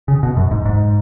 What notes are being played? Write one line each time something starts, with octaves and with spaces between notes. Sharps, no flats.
C#3
B2
F#2
G#2
G#2